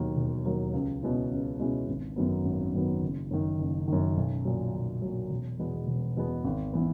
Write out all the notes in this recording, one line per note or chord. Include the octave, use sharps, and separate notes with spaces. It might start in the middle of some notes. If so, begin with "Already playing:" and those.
Already playing: E1 D#2 D#3 F#3 A#3
E1
D#2 D#3 F#3 A#3
C#2
B2 G#3 C#4 E4
C#2
B2 G#3 C#4 E4
G#1
F#2 D#3 F#3 B3
G#1
F#2 D#3 F#3 B3
F#1
F#2 D#3
F#1
F#2 D#3
B1
A#2 F#3
B1
F#3
A#2
E1
E2 B2 G#3 B3
E1
E2 B2 G#3 B3
G#1
E3 B3